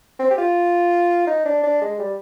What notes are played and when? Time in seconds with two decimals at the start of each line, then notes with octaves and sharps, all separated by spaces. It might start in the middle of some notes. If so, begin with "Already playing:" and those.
0.19 C4
0.30 G4
0.38 F4
1.27 D#4
1.45 D4
1.63 D4
1.81 G#3
1.99 G3